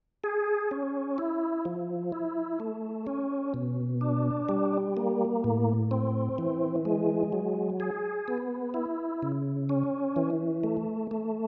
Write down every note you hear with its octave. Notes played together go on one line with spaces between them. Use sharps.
G#4
C#4
E4
F3
E4
A3
C#4
B2
D4
G3
A#3
A2
C4
E3
G#3
F#3
G#4
B3
E4
C#3
C#4
E3
A3
A3